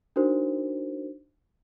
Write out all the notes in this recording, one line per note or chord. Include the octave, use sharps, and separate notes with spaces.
D4 D#4 F#4 A#4 C5